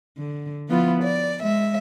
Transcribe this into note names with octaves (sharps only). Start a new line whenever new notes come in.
D3
F3 B3 E4 F4
D5
G#3 E5